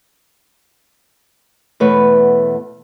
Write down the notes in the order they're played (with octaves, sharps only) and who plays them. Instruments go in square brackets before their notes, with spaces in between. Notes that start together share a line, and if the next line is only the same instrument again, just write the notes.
[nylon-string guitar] E2 B2 A3 B4 C#5 F#5